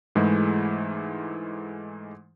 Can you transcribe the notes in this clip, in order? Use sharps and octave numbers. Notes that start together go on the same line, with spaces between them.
G#2 E3 G#3 A3 E4